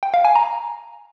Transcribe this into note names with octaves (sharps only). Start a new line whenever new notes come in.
G5
F5
G#5
A#5